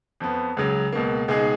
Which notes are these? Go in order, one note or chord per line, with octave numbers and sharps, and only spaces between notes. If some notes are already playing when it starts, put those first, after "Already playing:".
F2 F3 B3
C#2 C#3 F#3
C#2 B2 A#3
C#2 B2 G#3 D#4 G#4